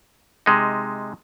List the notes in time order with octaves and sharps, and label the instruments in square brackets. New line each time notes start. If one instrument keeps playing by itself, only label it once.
[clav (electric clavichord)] C3 G#3 D#4